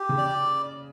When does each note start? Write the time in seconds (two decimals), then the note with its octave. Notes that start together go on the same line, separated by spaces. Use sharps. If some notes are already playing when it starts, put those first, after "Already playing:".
Already playing: G4
0.09 C#3
0.18 D5